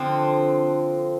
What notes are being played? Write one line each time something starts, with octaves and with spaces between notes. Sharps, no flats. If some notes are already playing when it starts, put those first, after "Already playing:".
Already playing: D3 F3 C4